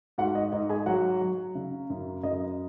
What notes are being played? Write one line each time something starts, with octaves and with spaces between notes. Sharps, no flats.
G#2 F#4 F#5
D#5
G#2 D#5
G#4 G#5
F#3 F#4 F#5
F#3
C#3
F#2
F#2 D#5